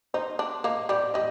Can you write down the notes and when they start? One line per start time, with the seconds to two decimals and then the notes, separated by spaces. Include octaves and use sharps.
0.14 D#4 C5
0.39 D4
0.64 A#3 D#5
0.89 G3 D5
1.14 G3 D#5